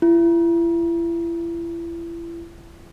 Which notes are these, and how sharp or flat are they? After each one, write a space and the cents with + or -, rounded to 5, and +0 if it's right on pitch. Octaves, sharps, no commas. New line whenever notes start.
E4 +35